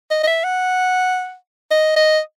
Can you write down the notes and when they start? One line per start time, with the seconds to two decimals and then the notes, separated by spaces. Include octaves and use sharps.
0.11 D#5
0.23 D#5
0.27 E5
0.44 F#5
1.71 D#5
1.96 D#5